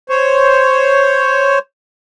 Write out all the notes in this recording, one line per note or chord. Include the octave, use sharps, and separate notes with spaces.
C5 C#5